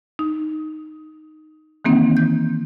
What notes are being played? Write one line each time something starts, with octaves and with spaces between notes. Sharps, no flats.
D#4
D#3 E3 A#3 C4 D#4
G6